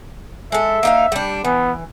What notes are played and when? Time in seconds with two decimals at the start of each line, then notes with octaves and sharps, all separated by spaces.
0.52 G#3 A4 E5
0.83 A#3 D#4 F5
1.12 G3 D4
1.45 E3 B3